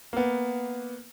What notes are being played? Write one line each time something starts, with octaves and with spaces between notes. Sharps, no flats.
A#3 B3